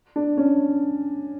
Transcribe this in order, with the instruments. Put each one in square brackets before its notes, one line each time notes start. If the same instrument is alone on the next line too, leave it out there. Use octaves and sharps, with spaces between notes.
[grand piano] D4
C#4